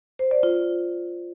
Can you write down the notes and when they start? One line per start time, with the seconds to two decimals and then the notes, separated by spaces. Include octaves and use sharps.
0.19 C5
0.31 D5
0.43 F4